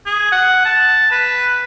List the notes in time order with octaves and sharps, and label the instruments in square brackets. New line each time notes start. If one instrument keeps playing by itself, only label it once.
[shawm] G#4
F#5
A5
B4